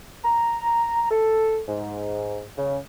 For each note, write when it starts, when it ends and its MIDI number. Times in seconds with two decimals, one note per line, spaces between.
0.24 1.07 82
1.10 1.61 69
1.68 2.44 44
2.57 2.77 49